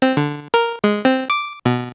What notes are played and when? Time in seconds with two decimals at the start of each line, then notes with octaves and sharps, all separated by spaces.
0.02 C4
0.17 D3
0.54 A#4
0.84 G#3
1.05 C4
1.30 D6
1.65 B2